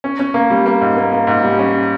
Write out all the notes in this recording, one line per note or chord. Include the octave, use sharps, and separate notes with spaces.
C#4
C#4
A#3
G3
A#3
G#2
A#3
A#3
G#2
G3
C#4